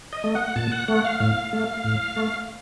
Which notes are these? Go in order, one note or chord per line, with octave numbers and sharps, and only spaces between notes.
D#5
A3
F#5
A#2 A5
F#5
A3 F#5
F5
A2 F5
A3
A2
A3